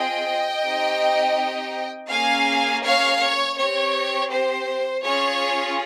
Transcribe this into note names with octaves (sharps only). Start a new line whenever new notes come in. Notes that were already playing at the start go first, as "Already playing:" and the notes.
Already playing: C4 F4 G#4 D#5 G5
C4 D#4 G4
A#3 C#4 G#4 F5 G#5
C#5 F5
C#5
C4 G4 C#5
C5
C#4 F4 G#4 C#5